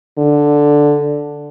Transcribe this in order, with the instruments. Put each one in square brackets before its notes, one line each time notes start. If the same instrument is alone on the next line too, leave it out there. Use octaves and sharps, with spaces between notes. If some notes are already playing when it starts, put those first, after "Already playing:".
[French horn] D3